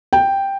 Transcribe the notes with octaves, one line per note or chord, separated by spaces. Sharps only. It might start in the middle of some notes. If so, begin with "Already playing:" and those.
G5